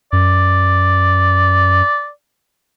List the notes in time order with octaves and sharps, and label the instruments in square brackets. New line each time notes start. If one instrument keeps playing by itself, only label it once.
[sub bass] F#2 [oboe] D5